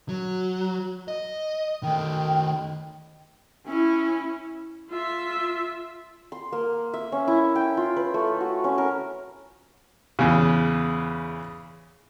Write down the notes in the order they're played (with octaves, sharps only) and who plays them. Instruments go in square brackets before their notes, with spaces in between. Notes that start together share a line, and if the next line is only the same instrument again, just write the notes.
[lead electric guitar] F#3
D#5
[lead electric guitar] D#3 A3 [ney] G5
[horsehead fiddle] C#4 E4
[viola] F4 E5
[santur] C6
A#3
E5
C#4
E4
G5
F4
B4
A3
F#4
C#4
A#4
[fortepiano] E2 C#3